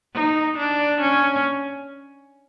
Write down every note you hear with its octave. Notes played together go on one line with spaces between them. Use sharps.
D#4
D4
C#4